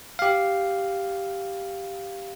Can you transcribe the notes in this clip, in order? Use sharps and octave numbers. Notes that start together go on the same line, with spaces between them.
G4 F5